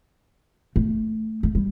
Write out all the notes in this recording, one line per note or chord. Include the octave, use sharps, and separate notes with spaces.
A3
A3
G3